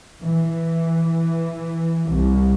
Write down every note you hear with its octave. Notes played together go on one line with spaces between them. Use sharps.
E3
C2